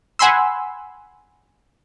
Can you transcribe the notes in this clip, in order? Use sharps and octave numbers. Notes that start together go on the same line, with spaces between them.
F#5 G#5 B5 C6 E6